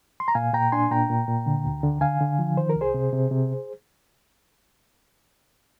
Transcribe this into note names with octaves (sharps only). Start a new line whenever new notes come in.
C6
A#5
A#2 F5 G#5
A#2 G5 A#5
D4 G#5 C6
A#2 G5 A#5
A#2
A#2
D3
D2
D3
D3 F5 G#5
D3
F3
D#3 C5
A#4
C2
G#4 C5
C3
C3
C3